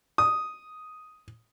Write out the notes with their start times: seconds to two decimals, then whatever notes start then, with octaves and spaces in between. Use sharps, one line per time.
0.18 D#6